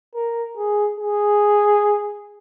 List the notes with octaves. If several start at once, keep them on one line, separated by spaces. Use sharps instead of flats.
A#4
G#4
G#4